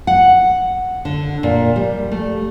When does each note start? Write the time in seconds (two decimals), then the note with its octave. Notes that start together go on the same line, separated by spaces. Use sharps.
0.07 F#5
1.05 D3
1.43 A#2
1.76 G3
2.12 A3